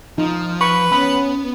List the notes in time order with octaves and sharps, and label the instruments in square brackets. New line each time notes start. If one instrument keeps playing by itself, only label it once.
[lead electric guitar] F3 [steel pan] D#4
[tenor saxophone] B4 [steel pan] C#6
[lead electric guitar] B3 [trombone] C#4 [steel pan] B5